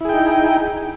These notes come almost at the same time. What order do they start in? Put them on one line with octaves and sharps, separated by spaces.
E4 G#4 G5 D#4